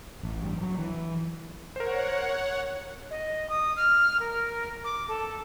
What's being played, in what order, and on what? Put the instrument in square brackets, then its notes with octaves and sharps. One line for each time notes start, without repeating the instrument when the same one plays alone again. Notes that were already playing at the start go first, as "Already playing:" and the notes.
[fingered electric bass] A1
G2
F#3
E3
[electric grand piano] A#4 C5 [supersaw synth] C#5 F#5
[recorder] D#5
D#6
F6
A#4
D6
A4